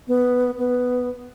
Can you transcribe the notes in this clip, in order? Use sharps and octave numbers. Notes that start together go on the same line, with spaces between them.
B3
B3